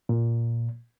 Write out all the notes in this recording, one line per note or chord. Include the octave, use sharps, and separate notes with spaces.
A#2